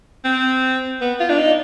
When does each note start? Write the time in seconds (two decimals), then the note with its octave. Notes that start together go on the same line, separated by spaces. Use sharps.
0.25 C4
1.01 B3
1.20 F4
1.29 D4
1.38 D#4